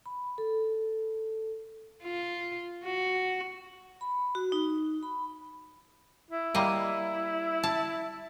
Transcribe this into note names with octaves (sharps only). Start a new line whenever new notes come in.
B5
A4
F4
F#4
B5
F#4
D#4
B5
E4
G3 A#3 D#5
A5